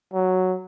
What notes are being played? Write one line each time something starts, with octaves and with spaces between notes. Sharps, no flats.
F#3